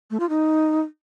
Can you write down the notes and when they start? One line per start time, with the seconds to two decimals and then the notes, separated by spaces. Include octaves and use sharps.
0.11 A3
0.20 F4
0.29 D#4